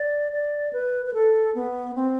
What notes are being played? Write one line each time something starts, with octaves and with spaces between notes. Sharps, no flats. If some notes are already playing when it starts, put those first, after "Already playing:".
Already playing: D5
D5
B4
B4
A4
B3
C4